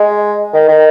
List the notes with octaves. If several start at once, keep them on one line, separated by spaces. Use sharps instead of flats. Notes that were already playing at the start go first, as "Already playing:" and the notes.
Already playing: G#3
D#3
D#3